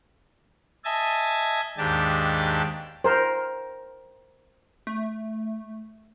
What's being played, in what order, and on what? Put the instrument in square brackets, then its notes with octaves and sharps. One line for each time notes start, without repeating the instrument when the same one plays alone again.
[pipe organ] D#5 E5 G#5 A5
D#2 G#2 D4 G4 A5
[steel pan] A#4 C5
[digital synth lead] A3